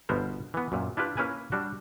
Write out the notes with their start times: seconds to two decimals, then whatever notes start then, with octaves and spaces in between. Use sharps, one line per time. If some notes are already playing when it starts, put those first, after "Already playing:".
0.09 G1 B2 B3 A#4 C5
0.54 E3 B3
0.72 F#2 A#2
0.97 D4 E4 F4 G4 B4
1.17 A#3 C#4 E4 B4 G#5
1.52 G3 D4 F#4